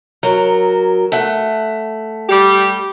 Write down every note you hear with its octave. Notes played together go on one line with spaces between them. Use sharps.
F#3 A#4
A3 F#5
G3 G4